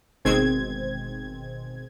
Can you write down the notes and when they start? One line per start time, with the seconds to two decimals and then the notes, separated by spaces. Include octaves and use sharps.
0.25 G1 B2 D#3 G#3 C4 G#6